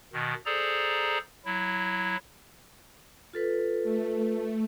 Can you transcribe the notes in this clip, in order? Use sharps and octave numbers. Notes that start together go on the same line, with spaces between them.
B2 D#3
G#4 A4 C5 D5 A#5
F#3 E4
F4 A4 B4
A3